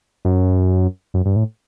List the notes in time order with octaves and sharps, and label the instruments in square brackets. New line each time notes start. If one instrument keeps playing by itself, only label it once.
[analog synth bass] F#2
F#2
G2
A2